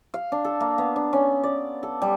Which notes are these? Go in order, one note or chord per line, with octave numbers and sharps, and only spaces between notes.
F5
D4
A4
A#3
B3
D4
C#4
D5
A4
G3